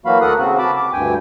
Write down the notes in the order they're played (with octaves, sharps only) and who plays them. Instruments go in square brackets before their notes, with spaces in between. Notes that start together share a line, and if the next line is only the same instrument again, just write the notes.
[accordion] E3 F#3 A#3 F#4 F5 B5
D2 A4 A#4 F#5 D#6 F#6
C#3 C4 F#4
A5 B5 D6
D6
D2 G2 G5 G#5